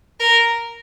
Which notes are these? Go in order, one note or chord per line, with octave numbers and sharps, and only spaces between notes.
A#4